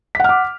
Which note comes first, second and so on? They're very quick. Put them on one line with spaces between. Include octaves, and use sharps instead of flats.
B6 F#5 F6 D6